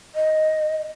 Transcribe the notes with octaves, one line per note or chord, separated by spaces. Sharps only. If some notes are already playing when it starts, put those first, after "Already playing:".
D#5